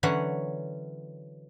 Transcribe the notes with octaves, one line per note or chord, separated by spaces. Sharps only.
D3 E3 F#3 C#4 F#5